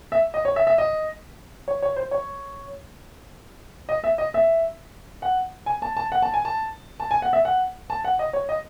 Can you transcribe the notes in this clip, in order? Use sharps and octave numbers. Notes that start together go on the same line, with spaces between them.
E5
D#5
C#5
E5
E5
D#5
C#5
C#5
C5
C#5
D#5
E5
D#5
E5
F#5
G#5
A5
A5
F#5
A5
G#5
A5
A5
G#5
F#5
E5
F#5
A5
F#5
D#5
C#5
D#5